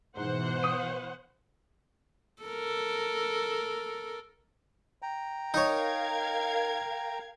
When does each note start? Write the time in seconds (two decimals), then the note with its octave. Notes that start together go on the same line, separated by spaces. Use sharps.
0.17 G#2 B2 E3 C5 F#5
0.63 D#6 D#7
2.43 A4 A#4
5.02 G5 A#5
5.54 D#4 A#4 C#5 F5 G#6